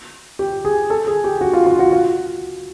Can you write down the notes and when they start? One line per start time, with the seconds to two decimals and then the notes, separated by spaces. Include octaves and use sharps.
0.39 G4
0.65 G#4
0.90 A4
1.07 G#4
1.24 G4
1.41 F#4
1.53 F4
1.66 F4
1.79 F#4
1.92 F4